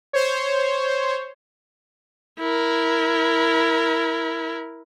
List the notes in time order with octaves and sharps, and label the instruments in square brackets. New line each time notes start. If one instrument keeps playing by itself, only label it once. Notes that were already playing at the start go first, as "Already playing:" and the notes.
[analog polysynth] C5 C#5
[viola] E4 A#4